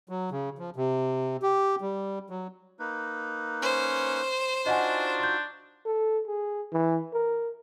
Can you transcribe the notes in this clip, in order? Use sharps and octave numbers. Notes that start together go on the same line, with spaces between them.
F#3
C#3
F3
C3
G4
G3
F#3
A#3 D#4 B4
C#4 C5
D4 D#4 F4 F#4 D#5 F#5 G#5
C6 G6
A4
G#4
E3
A#4